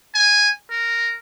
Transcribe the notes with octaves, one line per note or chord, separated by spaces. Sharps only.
G#5
A#4